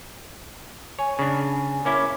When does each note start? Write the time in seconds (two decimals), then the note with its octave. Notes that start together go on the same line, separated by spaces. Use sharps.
0.99 C#5 G#5
1.19 C#3 D4
1.85 A#3 C#4 E4 D6